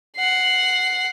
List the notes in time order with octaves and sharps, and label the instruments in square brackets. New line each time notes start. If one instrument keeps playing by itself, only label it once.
[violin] F#5 C7